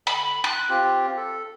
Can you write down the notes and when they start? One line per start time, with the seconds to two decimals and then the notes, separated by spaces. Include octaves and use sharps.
0.07 D3 B5
0.44 C6 F#6
0.69 C4 F4 G4
1.17 A4